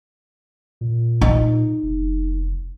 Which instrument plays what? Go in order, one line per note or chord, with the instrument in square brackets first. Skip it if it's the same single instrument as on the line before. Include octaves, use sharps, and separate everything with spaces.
[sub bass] A#2
[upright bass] D#4
[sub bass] F1